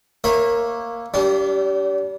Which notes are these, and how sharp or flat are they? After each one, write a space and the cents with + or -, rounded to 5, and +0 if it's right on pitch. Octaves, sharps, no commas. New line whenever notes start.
A#3 +0 C#5 -25 E5 +0
G3 -15 D4 -45